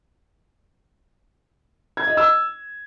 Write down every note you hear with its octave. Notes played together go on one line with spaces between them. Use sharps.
G#6
D#5
E6